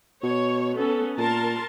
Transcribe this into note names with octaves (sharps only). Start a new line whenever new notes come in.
B2 C#5
B3 C#4 A4
A#2 A#4 A5 C6